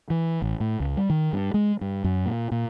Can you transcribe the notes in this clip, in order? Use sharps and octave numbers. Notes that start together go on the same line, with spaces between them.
E3
A1
A2
C#2
G3
D#3
G2
G#3
G2
F#2
A#2
A#2